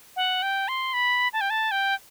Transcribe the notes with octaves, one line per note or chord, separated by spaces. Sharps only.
F#5
G5
C6
B5
A5
G5
A5
G5